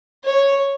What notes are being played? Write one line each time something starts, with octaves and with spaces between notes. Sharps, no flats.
C#5